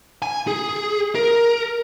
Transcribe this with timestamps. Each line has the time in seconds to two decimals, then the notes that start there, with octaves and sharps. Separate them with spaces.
0.22 G#5
0.47 G#4
1.15 A#4